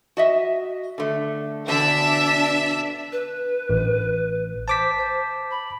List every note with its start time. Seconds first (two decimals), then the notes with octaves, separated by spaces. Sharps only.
0.17 F#4 D#5 E5
0.98 D3 A3
1.67 E2 B2 D3 D4 E5
3.12 B4
3.69 A1
4.68 C5 A5 D6 B6
4.98 C5
5.51 B5